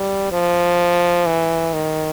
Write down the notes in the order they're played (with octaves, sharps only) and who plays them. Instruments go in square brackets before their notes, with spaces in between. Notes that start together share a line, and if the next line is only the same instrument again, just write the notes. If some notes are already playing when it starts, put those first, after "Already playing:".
Already playing: [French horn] G3
F3
E3
D#3